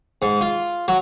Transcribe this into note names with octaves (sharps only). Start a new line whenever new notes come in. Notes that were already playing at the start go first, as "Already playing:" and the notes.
G#2
F4
F#3